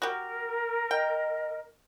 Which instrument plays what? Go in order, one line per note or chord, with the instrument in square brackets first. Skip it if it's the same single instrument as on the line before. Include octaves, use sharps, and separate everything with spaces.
[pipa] F#4 G4 [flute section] A#4
[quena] D#5 [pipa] G5